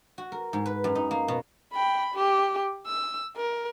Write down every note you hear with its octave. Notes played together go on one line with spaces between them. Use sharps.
F#4
A#4
G#2
B4
F#2
D#4
A#3
B2
G5 B5
G4
E6
A#4